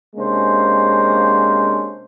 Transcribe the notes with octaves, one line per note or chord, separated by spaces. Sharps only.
C3 G#3 A#3 C#4 D4 C5